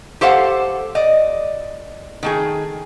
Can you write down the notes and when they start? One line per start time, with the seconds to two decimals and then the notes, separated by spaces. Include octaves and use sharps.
0.21 G4 A4 C5 F5 F#5
0.95 D5 D#5
2.23 D#3 A3 G#4